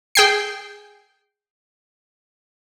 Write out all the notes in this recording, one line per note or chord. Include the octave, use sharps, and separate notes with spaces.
G#4 G5 C7